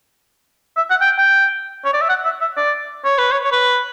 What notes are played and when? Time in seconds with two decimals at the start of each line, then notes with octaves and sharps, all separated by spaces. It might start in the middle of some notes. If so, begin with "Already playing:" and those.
0.77 E5
0.90 F#5
1.01 G5
1.18 G5
1.85 C#5
1.93 D5
2.02 E5
2.09 F#5
2.25 E5
2.41 E5
2.57 D5
3.05 C#5
3.18 B4
3.31 C#5
3.44 C#5
3.52 B4